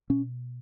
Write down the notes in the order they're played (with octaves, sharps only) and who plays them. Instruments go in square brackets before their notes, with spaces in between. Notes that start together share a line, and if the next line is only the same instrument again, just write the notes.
[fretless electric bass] B2 C#4